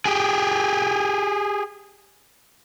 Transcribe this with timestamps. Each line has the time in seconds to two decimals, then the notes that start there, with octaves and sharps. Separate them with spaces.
0.05 G4 G#4